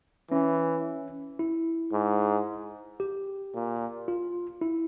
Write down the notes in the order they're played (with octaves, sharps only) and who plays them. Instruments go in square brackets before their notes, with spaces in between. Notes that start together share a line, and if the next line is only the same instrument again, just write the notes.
[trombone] E3 [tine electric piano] C#4
[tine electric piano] E4
[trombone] G#2
[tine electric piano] G4
[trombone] A#2
[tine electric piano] F4
E4